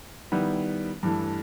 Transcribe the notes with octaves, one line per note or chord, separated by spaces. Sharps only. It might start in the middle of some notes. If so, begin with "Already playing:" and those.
D#3 G3 B3 E4
G2 E3 A3